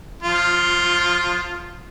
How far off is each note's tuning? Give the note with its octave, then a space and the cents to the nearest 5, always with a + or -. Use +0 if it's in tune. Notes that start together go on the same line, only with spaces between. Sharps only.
F3 +25 F4 +0